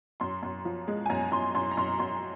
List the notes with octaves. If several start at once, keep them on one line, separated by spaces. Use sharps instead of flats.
F#2 C6
F#2
F3
G#3
G#5
F#2 A#5
F#2 C6
F#2 C6
A#5
F#2 C6
F#2 C6